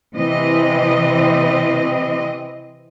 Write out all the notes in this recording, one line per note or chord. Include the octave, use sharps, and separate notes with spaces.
C3 E3 C4 D#5